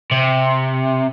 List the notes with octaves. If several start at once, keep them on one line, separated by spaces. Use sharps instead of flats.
C3